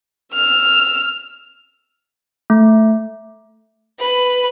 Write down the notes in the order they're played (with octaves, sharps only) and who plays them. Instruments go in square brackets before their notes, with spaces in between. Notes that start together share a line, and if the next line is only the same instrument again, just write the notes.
[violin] E6 F6
[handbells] A3
[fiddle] B4